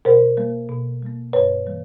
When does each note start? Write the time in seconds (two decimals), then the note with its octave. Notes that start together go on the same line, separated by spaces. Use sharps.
0.05 B2 A#4 C5
0.37 G3 A#3
0.69 B2
1.02 G3 A#3
1.33 G2 B4 C#5
1.66 E3 G3 A#3